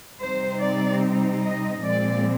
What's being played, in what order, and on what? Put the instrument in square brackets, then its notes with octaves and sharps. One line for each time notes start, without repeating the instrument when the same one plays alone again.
[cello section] C3 G3 C4 D#4 C5
D5
D#5
A#2 F3 G#3 C4 D5